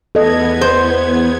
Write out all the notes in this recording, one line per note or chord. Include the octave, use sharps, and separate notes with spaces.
E2 B3 A4 D#5 G#6
C5